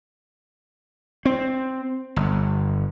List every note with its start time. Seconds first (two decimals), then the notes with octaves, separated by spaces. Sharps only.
1.25 C4
2.16 G1